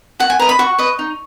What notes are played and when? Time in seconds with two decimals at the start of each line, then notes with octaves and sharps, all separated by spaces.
0.20 F#4 F#5
0.30 G#5
0.39 B4 D#5 A#5
0.49 B5
0.59 F#4 C#6
0.78 B4 D#5
0.99 D#4